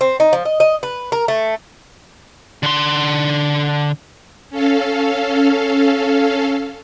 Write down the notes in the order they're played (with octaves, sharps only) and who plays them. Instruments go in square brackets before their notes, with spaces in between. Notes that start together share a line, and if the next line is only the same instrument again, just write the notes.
[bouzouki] C4
D#4
F3
D#5
D#5
B4
A#4
A3
[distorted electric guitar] D3 C6
[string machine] C#4 A4 F5